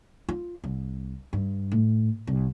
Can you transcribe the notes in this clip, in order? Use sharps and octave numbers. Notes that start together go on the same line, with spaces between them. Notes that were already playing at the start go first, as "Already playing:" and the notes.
F4
C2
G2
A2
C2